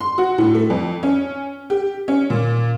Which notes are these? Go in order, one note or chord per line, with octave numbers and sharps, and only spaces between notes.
C6
F#4
A2
A3
F2
C#4
G4
C#4
A#2